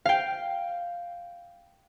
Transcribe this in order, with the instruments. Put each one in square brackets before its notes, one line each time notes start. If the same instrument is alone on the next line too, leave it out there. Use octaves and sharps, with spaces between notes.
[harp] F5 G5